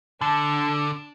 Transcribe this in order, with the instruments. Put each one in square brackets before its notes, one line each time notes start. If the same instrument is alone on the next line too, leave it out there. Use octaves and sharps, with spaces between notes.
[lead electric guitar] D3 [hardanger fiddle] D4 [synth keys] A5